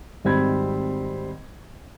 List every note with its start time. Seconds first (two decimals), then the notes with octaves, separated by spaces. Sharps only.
0.25 G#1 G#2 G3 C4 B5 G#6